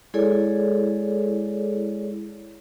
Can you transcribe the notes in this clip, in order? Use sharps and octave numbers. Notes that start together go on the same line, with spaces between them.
G#3 E4 G#4 A4 C#5 D5